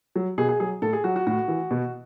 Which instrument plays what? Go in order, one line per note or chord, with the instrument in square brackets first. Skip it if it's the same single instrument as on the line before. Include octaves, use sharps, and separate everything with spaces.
[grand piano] F#3
B2 G#4
G#4
F#3 G#4
A2 A4
G#4
F#3 F#4
F#4
A2 F#4
E3
B2